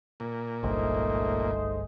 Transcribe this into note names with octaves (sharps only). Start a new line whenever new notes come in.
A#2
G1 C2 G#2 A3 G#4 C5 D#5